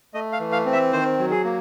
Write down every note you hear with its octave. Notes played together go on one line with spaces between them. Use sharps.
A3 D#5
F5
E3
F5
C4
E5
D#3 C5
F#3
G#4
A#3